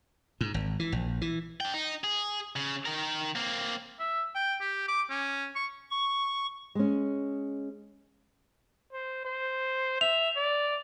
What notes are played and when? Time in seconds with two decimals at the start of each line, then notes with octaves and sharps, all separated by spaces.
0.41 G#2
0.54 G#1
0.79 E3
0.92 A#1
1.21 E3
1.61 D4 G5
1.74 D#4
2.04 G#4
2.56 C#3
2.85 D#3 A#4
3.35 A#3 C4
4.00 E5
4.35 G5
4.61 G4
4.88 D6
5.10 C#4
5.56 C#6
5.91 C#6
6.75 G#3 C#4
8.93 C5
9.25 C5
10.01 E5 F7
10.36 D5